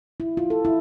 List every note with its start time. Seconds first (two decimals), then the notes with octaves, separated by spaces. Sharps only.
0.20 E4
0.37 F4
0.50 A4
0.65 E4